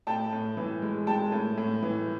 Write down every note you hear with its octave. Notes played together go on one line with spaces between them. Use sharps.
A2 G5 A5
A2
E3
G#3
G#3 G5 A5
A2
A2
E3